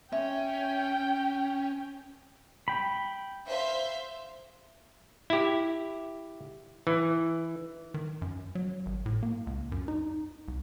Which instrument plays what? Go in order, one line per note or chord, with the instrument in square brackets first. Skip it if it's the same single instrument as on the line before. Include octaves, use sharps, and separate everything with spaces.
[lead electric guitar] C#4 [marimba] E5 [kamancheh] G5
[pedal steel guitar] G5 B5
[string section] C5 E5 F5
[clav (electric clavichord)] E4 G4
E3
[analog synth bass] D#3
F#2
F#3
G#1
A2
A#3
C#2
F#2
D#4
C2